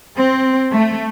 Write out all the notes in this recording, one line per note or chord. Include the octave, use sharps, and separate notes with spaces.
C4
A3